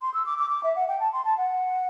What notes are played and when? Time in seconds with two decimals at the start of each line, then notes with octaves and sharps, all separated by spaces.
0.02 C6
0.14 E6
0.26 D6
0.38 D6
0.50 D6
0.63 E5
0.76 F#5
0.88 G5
1.00 A5
1.13 C6
1.25 A5
1.38 F#5